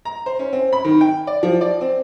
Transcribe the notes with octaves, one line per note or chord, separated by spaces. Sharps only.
A#5
C5
C#4
C4
B5
D#3
G5
D5
F3
D5
C4